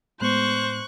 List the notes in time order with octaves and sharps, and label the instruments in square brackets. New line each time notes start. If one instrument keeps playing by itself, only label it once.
[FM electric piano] A2 G#3 B3 [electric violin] C5 [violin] C#6 F#6